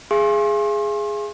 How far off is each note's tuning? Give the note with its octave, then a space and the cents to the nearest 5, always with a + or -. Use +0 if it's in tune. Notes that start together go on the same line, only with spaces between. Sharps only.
G#4 +0 F5 -45 C6 +40